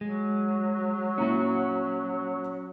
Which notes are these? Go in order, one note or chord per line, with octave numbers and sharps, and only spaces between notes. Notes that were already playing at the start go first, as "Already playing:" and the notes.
F#3 G#3
A#2 C#4 E4 F#4 A#5